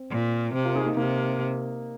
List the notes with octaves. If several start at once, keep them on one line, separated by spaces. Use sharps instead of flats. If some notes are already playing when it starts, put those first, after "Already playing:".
Already playing: C4
A#2
C3 C4
F4 A#4
D#4 G#4
A#3 D#4
C3 A#3 D#4